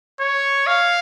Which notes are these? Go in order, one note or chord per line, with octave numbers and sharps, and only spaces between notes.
C#5
F5